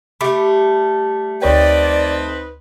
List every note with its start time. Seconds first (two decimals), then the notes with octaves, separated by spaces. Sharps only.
0.21 G3 A3 B5 D6
1.42 D2 C4 D#4 B4 C#5 D5 G5